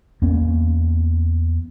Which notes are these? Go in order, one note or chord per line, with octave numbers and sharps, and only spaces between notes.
E2 A#3 B3 C#4